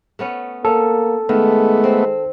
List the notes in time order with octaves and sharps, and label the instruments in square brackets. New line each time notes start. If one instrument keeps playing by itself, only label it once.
[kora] A3 B3 C#4
[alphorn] A#3 [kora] C#4 [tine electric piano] A4
[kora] D#3 [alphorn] G#3 [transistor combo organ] A3 B3
[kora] C4